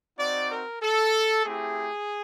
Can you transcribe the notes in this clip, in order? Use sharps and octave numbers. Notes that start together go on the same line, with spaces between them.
C4 D#4 F#4 D5
A#4
A4
A3 C4 E4 G4 G#4